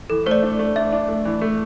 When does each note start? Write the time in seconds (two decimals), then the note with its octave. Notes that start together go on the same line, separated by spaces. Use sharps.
0.10 E3 A4
0.26 A3 C5
0.31 D5
0.43 D4
0.59 A3
0.76 D4 E5
0.93 D4
1.08 A3
1.25 E3
1.41 A3